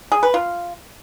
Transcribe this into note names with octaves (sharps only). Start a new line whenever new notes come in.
G#4
B4
F4